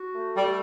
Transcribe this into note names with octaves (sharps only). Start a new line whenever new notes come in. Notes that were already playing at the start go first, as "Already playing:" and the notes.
Already playing: F#4
A3
G3 A4